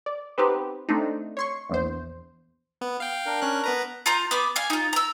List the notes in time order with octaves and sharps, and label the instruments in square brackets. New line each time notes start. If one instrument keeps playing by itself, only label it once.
[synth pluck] D5
B3 C4 D#4 G4 B4
A3 C4 D4 D#4
C#5 C6 C#6
A#1 E2 C5
[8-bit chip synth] B3
F5 G5
[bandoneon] D4 A#4
[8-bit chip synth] C#4 F#6
B3 B4 A#5
[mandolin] F4 A#5 G6
B3 B5 D6
F5 G#5
D#4 F4
A#5 E6